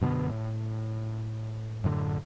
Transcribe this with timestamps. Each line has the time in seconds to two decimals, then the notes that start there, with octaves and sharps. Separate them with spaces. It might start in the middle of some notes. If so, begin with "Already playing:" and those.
0.01 F#2 B2 D3 B3
0.29 A2
1.84 F#2 A2 D3